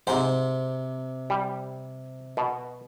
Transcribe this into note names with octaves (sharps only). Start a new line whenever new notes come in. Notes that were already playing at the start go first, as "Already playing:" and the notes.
G#2 C3 C5
G3
B2